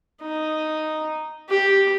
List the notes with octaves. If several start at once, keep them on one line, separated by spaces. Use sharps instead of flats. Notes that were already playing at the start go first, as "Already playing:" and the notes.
D#4
G4